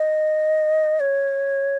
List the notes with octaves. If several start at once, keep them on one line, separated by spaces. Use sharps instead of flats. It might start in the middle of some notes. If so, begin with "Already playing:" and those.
Already playing: D#5
C#5